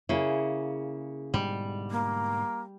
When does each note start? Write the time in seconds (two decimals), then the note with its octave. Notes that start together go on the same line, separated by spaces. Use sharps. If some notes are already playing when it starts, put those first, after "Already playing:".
0.09 C#3 A#3 E4 G#4
1.34 G#2 B2 D3 G3
1.91 A#3